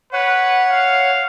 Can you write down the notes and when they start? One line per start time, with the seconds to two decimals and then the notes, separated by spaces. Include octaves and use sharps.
0.13 B4 C#5 F#5
0.70 F5